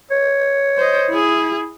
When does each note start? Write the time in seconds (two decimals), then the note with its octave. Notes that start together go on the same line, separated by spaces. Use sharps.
0.11 C#5
0.78 C5 D#5
1.10 E4 G#4